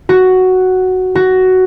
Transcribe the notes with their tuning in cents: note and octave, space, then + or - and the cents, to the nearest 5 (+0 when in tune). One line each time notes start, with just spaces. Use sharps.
F#4 +5
F#4 +10